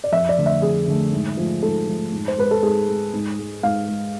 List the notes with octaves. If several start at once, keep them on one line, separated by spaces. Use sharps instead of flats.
D5
F2 E5
D5
D3 A3
E5
F2 G#4
D3 A3
G#2
F3 A3
G#2 A4
F3 A3
G#2
C5
G#3 B4
A4
G#2 G#4
G#3
G#2
G#3
G#2 F5
G#3